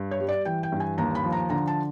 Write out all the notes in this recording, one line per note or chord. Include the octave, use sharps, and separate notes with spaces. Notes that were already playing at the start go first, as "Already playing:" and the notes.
Already playing: G2
C#5
G3
D5
E3 G5
G5
G2
G#5
D#2 A#5
B5
F3
A#5
D3 A#5
A5